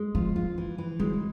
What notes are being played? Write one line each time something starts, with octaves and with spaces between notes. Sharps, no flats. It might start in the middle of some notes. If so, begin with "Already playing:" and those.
Already playing: G#3
F3 F4
F4
E3
E3
F#3 G#3